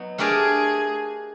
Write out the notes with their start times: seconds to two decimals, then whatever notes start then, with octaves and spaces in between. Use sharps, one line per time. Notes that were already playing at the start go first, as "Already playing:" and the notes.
Already playing: F#3 B3 D#4
0.18 A3 D4 G4 G#4 A#4 D5